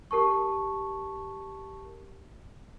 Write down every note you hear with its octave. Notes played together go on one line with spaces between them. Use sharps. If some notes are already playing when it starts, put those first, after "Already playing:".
G4 A#4 A5 C#6